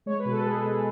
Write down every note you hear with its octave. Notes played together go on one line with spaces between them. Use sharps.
G#3 C#5
B4
B2
A4
G#3 G#4
G#3